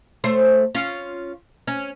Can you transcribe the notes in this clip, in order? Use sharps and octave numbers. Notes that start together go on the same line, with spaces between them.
A3 C5 C#5
C#4 F4
C#4